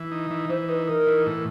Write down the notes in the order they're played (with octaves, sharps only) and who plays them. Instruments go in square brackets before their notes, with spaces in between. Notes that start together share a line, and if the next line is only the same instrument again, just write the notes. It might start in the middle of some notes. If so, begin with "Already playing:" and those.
Already playing: [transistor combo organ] E3
D#4
E3
[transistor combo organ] E3 [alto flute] C5
[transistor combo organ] D#4 [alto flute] B4
[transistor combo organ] D#4 [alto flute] A#4
[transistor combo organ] E3
A2